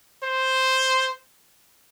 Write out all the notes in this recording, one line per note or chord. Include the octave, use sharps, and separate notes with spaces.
C5